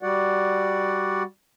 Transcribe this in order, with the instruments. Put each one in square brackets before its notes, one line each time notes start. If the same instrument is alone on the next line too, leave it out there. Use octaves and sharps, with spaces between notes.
[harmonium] G3 F#4 D5 F#5